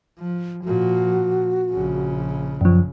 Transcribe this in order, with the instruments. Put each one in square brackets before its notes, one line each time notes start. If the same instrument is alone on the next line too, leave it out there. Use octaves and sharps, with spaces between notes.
[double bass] F3
[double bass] A#2 F3 [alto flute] F#4
[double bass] A#1 C#3
[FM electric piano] F#2 F3